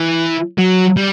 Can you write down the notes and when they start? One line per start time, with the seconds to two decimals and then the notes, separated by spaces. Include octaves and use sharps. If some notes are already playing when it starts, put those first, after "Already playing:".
Already playing: E3
0.58 F#3
0.97 G3